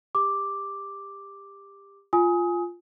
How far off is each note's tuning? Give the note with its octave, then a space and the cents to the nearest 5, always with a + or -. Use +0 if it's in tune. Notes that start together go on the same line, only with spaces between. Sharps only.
G4 +25 D6 +0
F4 +0 G#5 +5 D#6 +25